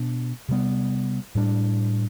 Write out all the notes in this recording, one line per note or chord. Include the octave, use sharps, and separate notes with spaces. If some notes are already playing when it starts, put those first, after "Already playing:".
Already playing: B2 B3 D4
C3 G3 B3
A2 G3 D4